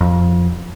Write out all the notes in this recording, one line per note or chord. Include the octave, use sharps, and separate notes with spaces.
F2